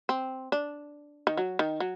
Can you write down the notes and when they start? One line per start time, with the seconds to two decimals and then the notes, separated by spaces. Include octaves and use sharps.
0.09 C4
0.52 D4
1.27 D#3
1.37 F#3
1.59 D#3
1.80 F#3